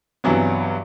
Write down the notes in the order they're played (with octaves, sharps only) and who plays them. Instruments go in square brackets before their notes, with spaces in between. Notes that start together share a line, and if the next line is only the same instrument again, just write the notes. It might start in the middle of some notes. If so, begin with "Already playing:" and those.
[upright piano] G2 C3 E3 F#3 B3